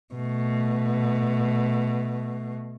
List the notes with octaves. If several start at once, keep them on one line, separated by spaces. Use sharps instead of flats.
B2 A3